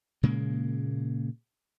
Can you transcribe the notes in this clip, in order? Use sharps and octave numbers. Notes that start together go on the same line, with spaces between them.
A#2 C#3 G#3 A#3